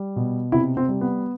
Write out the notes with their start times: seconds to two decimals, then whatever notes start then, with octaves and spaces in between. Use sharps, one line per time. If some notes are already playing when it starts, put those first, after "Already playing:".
Already playing: G3
0.16 B2
0.52 C3 E4
0.77 C4
0.88 G3
1.01 B3